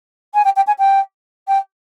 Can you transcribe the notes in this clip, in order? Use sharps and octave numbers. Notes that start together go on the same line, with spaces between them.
G#5
G5
G5
G#5
G5
G5